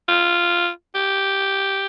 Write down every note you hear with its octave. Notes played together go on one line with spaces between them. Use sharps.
F4
G4